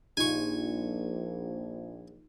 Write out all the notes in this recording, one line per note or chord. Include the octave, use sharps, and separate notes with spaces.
A#1 D#4 F4 G4 G#5 C#6